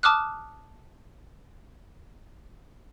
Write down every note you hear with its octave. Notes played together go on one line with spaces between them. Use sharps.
A5 D6 D#6 F6 F#6